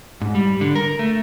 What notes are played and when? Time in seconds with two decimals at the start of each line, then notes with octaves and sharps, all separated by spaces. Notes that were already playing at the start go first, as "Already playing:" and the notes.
0.21 G#2
0.35 G3
0.61 D3
0.76 A#4
0.99 A3